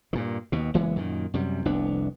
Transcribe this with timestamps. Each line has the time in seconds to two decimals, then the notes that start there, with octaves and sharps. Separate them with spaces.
0.13 G2 A#2 D#3
0.52 D#2 B2
0.74 F#1 E3 G#3 B3
0.96 F#2 A#2 D#3
1.34 F#2 C3 G3
1.65 F1 C2 B3 D4